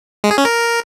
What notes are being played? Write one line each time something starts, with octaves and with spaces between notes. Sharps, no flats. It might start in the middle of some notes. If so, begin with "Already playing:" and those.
G#3
G#4
C#4
A#4